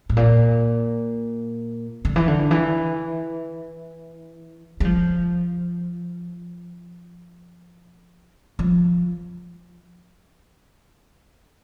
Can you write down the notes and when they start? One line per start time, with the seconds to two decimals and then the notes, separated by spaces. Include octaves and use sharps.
0.10 A2
0.17 A#2
2.05 D3
2.16 E3
2.28 D3
2.51 E3
4.80 G3
4.85 F3
8.59 F3